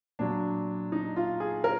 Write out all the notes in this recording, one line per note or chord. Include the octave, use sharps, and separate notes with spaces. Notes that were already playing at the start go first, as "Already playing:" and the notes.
A#2 F#3 D4
D#4
F4
G#4
A#4